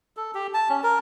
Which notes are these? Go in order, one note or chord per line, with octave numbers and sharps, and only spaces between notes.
A4
G4
A5
C#4
A#4